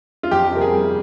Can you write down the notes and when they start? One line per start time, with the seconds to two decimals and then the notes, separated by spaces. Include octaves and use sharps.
0.23 F4
0.31 F2 G4
0.51 C3 A#4
0.61 G#4
0.72 G3